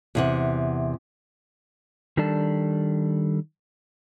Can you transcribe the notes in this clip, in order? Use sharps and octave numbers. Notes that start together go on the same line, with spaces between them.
E2 C3 F#5
D#3 G3 D4 A4 D5 A5